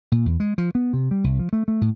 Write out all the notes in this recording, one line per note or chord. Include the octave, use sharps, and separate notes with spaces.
A#2
E2
G#3
F3
B3
C3
G3
C2
F3
A3
A3
A2